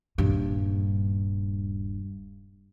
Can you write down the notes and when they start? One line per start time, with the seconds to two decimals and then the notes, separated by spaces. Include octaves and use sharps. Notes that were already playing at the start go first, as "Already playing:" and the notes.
0.18 D#1 G2